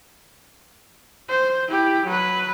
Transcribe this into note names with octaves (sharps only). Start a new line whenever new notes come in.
C5
E4 G4
F#3 B4